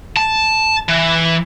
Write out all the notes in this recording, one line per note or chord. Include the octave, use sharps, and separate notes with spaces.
A5
E3